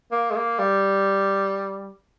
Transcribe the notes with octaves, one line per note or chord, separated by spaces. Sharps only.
A#3
G#3
A#3
G3